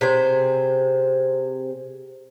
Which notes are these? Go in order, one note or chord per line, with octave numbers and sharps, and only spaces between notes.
C3 G#4 C5